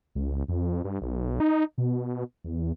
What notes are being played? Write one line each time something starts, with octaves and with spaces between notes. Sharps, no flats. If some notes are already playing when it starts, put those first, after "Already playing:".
C#2
F2
G2
B1
D#4
B2
E2